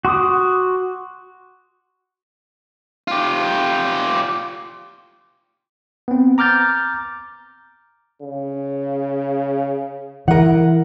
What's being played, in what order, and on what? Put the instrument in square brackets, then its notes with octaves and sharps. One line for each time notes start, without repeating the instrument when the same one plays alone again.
[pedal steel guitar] F#4 C6 D6 D#6
[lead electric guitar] F4 G4
[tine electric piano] B3 C4
A#5 D6 F6 G6 A6
[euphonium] C#3
[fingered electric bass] E3 [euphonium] E4 [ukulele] A#4 F#5